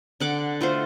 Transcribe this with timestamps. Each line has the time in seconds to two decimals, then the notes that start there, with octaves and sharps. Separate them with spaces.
0.20 D3 F#5 D6
0.61 A3 F4 F#4 C5